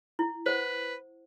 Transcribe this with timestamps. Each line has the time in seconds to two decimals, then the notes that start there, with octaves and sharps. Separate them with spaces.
0.19 E4
0.46 B4 C5 F#5